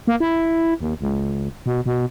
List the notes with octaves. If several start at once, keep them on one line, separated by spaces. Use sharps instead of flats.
A#3
E4
D#2
C#2
B2
B2